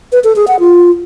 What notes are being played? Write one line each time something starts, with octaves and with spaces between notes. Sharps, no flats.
B4
A4
G#4
F#5
F4